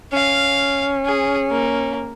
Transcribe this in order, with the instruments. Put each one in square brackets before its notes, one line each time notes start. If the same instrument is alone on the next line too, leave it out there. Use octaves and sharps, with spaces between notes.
[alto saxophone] C#4 [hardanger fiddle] F5
[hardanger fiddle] G#4
A#3